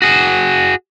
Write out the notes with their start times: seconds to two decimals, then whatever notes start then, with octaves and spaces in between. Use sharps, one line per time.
0.02 F#4 G#4